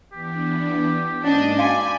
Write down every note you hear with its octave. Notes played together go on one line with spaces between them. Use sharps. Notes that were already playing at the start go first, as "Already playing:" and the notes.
E3 B3 D4 G4
G#2 A#3 C#4 D4 F#4 D#5 A5
D5 F5 G5 G#5 B5 C6 G6